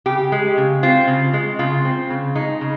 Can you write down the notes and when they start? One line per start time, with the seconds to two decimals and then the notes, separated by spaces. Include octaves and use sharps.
0.06 C#3 G4
0.32 G#3
0.57 C#3
0.83 C4 F4
1.07 C#3
1.33 G#3
1.59 C#3 F4
1.85 C4
2.10 C#3
2.35 G#3 D#4
2.61 C#3